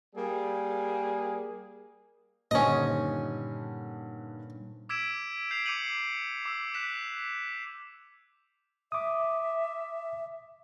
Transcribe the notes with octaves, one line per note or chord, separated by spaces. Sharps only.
G3 A#3 G#4
G2 A#2 D3 D#3 C#4 C5 C#5 D#5
D6 E6 G#6 B6 D7 E7
G6 C7 D7 F7
D6 C#7 D#7 F7 F#7
D6 E6
F#6 B6 E7
E5 D6 D#6